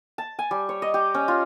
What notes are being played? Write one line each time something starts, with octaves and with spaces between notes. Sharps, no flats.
A5
G#5
G3
C#5
D#5
G4
C#4
F4